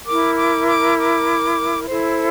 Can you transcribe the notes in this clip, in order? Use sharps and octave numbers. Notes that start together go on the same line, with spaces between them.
E4 A#4 D6
D6
D6
D6
E4 A4 C5